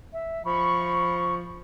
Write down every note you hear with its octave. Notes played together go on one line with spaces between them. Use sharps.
E5
F3 B5 C#6